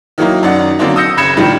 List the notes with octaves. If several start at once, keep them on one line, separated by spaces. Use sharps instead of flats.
D#3 F#3 A#3 D#4 E4
F#2 D#4 D5 F#5
D3 F#3 A#3 C4 D4 D#4
D#6 E6 G6 A#6 C#7
F#1 B5 G#6 C#7 E7
A2 D3 D#3 F3 G3